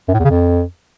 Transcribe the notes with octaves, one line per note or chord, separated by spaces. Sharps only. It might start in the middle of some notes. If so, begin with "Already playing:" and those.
F#2
A2
E2
C#3
F2